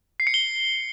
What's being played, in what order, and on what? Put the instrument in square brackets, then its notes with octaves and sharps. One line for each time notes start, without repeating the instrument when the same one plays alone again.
[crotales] C7
C#7
G7